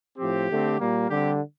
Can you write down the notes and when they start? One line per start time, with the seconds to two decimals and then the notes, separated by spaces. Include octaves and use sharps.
0.18 A2 F3 C4 G4
0.49 D3 A3 C4
0.79 A#2 G3 A#3
1.10 D3 G3 C4 G4